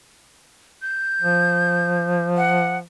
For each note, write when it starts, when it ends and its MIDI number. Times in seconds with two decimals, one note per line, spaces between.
0.82 2.27 91
1.21 2.83 53
2.37 2.78 78